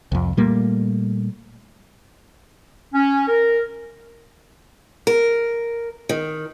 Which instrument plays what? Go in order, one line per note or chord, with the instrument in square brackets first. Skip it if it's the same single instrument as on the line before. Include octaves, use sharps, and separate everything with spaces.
[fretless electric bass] C2 F2
A#2 G3 A3 A#3
[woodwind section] C#4
A#4
[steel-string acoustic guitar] A#4
D#3